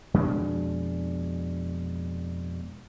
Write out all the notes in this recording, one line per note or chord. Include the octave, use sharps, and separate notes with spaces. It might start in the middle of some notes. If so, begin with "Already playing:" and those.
F2 B2 G#3 D4